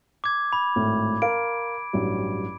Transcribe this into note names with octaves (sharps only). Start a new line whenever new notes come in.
D6 G#6
B5
G#1 A2
A#4 F5 D7
A1 G2 F#3